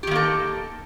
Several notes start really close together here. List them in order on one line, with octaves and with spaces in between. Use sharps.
G4 D#3 A#3 A4